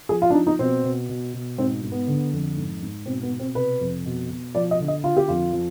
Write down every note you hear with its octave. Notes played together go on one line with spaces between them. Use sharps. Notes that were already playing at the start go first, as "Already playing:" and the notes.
F3 G#4
F4
D4
F3 D#4
D#4
B2 C4
B2
B2
B2
G#2 C4
G#2
B3
D3
F2
G#2
G#2
B2 C4
B3
B2
C4
C3 B4
F2
B2
B2
F3 D5
D#5
D3
D#5
D3 F4
G4
F2 F4
F3